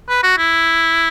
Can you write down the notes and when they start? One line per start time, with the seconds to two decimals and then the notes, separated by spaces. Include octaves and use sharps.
0.09 B4
0.23 F#4
0.38 E4